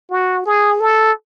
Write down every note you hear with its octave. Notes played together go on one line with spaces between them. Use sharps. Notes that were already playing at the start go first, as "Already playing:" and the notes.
F#4
G#4
A4